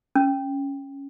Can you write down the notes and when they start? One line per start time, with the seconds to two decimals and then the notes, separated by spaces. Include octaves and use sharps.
0.16 C#4